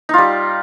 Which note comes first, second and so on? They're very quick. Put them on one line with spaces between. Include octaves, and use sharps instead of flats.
D#4 F4 G3